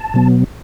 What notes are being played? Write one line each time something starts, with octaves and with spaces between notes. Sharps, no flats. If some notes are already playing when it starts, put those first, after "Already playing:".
Already playing: A5
B2 F#3 B3